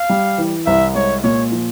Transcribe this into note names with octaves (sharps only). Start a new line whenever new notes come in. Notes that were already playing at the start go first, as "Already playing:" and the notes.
Already playing: F5
G3
E3
C2 E5
G#3 C#5
A#2 C#5
F3